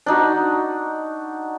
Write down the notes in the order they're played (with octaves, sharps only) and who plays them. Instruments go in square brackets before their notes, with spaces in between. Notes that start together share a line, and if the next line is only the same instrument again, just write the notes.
[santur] D4 D#4 F#4